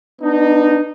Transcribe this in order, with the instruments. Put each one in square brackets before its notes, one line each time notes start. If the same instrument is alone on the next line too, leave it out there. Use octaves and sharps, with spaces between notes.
[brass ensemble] B3 D4 D#4